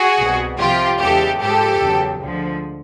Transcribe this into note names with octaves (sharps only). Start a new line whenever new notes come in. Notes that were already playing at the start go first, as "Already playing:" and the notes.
Already playing: F#4 G#4
C2 B2 G3
C2 C3 F3 F4 G4
E2 C#3 E3 G#3 G4 A4
G#2 F3 G#3 G4 A4
E2 C#3 F#3
D2 D3 F3 G#3